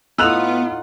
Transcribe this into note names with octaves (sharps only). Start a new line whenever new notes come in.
A2 B3 D#4 F4 F#5 E6 F#6 F7